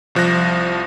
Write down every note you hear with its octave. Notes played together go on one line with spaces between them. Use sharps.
C2 F3 F#6 A#6